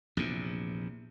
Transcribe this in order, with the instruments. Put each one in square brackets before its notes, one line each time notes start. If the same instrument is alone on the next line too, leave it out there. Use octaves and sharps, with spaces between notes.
[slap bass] A#1 E2 C3